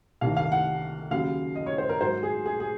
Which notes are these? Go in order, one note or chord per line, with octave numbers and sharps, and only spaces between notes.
C2 C3 D#3 F5
F5
F#5
D#2 C#3 F#3 F5
D#5
C#5
C5
A#4
G#2 F#3 C5
G#4
G#4
G#4